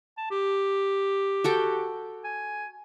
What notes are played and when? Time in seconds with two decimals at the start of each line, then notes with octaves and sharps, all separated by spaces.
0.18 A5
0.31 G4
1.44 F#4 A4 G5
2.24 G#5